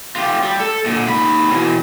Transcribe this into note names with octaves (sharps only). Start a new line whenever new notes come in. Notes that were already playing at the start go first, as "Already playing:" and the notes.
F4 G4
G3
A4
A#2 D3
D#2 B5
B2 E3